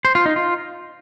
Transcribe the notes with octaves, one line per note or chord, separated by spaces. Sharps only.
C5
F4
D#4
F4